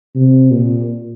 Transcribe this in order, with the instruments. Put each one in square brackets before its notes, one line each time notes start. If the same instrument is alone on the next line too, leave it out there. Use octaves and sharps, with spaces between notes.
[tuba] C3
A#2